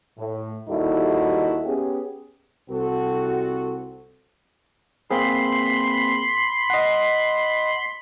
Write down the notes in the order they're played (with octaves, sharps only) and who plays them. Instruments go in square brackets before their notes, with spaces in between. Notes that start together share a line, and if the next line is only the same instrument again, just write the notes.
[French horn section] A2
D#2 G3 D#4 E4 F#4 A4
B3 C#4 G4 G#4
[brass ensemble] C2 C4 F#4 A4
[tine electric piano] A#3 C4 G#4 [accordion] B5 C6
[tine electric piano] D#5 F#5